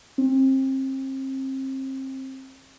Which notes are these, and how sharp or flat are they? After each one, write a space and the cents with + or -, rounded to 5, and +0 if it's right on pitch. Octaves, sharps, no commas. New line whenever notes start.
C4 +30